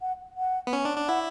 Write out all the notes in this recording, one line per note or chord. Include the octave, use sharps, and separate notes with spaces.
F#5
F#5
B3
C#4
D4
D4
E4 F#5